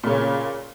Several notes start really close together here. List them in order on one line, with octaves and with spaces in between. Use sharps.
A#2 C#3 C#4